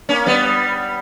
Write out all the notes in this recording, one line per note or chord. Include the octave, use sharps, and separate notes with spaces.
A#3 C#4
G3 B3